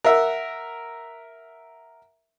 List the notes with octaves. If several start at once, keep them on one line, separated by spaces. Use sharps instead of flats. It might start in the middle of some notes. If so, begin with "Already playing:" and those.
A#4 E5 F#5